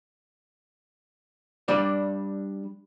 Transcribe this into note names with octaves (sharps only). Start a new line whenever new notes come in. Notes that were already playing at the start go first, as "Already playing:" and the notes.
G3 D4 D5